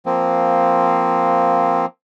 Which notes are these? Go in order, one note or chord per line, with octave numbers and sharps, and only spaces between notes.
F3 A#3 C4